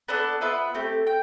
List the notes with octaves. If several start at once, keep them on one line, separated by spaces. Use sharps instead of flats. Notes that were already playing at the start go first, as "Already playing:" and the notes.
B3 D4 A4 D5
B3 F4 B4 E5
A3 C4 G4
G5